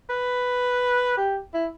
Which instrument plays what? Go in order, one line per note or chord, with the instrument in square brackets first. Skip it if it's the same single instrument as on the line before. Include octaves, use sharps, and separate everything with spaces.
[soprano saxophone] B4
G4
E4